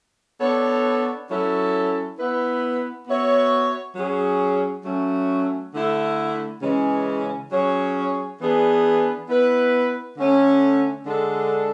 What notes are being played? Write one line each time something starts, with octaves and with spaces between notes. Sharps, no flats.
B3 D4 A4 C#5
F#3 C#4 E4 A4
B3 E4 B4
B3 F#4 C#5 E5
F#3 C#4 G#4
F#3 A3 C#4
D3 A3 E4
C#3 E3 G#3 C#4
F#3 C#4 G#4 C#5
E3 B3 D4 G#4
B3 E4 B4
D3 A3 C#4
D3 G#3 D4 A4